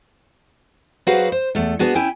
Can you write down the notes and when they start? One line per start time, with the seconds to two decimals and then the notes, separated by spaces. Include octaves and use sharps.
1.07 F#3 F#4 G#4 B4 C5 F5
1.32 C5
1.55 E2 A3
1.79 B3 D4 F#4 G#4
1.95 C#4 E4 G5 G#5